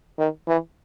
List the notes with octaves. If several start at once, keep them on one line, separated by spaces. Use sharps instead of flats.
D#3
E3